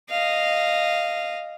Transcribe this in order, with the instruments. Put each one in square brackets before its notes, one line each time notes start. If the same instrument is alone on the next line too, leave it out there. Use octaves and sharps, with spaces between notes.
[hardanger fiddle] D#5 F5